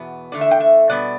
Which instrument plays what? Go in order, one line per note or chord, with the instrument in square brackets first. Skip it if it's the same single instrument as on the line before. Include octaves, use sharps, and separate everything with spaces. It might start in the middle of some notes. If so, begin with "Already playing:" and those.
Already playing: [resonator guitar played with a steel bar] E2 B2 B3
E2 D3 A3 D5
E5
G5
E5
B2 G3 B3 D5